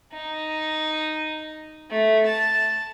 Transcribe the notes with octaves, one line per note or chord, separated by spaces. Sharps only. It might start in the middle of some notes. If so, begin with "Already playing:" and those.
D#4
A3
A5